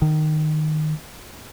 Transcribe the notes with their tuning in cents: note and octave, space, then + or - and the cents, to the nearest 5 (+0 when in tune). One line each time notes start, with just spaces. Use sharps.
D#3 -15